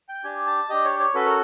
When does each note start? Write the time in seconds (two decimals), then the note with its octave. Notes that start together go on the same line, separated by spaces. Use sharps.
0.09 G5
0.24 D4 G4 G#5
0.47 A5
0.69 D4 G4 D#5
0.84 C#5
0.99 C#5
1.14 C#4 F#4 A4 B4
1.25 A#4